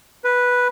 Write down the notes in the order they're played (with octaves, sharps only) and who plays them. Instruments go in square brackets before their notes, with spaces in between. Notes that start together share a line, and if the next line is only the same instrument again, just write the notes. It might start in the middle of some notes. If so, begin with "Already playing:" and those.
[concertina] B4